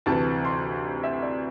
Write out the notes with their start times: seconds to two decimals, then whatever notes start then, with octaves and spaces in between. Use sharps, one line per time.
0.06 D2 C3 E3 A5
0.45 C6
1.03 E5
1.23 D5